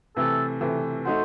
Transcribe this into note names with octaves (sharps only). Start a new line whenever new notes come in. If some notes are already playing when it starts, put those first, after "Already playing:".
C3 E3 A3 A4
C3 E3 A3
A3 D#4 F#4 C5